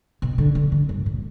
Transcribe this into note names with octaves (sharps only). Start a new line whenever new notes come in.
B2
D3
D3
D3
G2
A#2